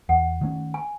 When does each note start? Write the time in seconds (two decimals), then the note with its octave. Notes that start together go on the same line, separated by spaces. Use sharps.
0.09 E2 F#5
0.41 D#3 A3 C#4
0.74 G#5